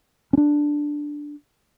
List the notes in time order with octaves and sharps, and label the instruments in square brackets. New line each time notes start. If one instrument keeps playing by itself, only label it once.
[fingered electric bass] C#4 D4